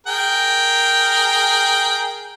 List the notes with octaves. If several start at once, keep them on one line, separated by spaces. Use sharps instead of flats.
G#4 A#4 G5